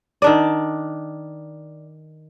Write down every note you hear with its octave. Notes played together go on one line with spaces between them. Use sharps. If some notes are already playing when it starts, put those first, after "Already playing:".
D#3 D4 D5